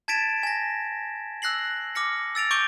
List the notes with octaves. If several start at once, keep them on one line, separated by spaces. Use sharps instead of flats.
A5 G#6 A6 B6 D7 E7
G#5 A#6
E6 F#6 A#6 C7 F#7
D6 F6 A#6 C#7
E6 A6 D7 F7
C#6 D6 G6 D7 D#7 G7